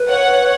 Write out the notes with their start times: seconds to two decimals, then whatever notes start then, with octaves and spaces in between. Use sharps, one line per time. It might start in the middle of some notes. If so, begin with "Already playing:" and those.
Already playing: B4
0.09 C#5 F#5